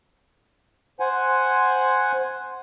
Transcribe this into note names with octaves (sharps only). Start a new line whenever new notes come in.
C5 F#5 G#5